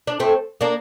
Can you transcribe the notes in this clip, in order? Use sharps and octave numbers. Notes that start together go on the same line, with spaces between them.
D4
A3 C4
A#3 D4